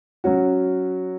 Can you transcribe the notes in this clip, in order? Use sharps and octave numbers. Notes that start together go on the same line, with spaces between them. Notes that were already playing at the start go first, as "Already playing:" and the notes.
F#3 C#4 F#4